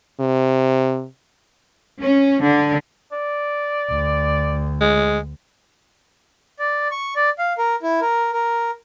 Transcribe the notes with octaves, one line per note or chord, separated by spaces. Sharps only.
C3
C#4
D3
D5
D2
G#3
D5
C#6
D5
F5
A#4
E4
A#4
A#4